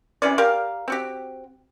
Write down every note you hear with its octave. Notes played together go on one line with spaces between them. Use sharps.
C3 E3 C#4 D5
G4 A#4 D5 F5
C4 F#4 G4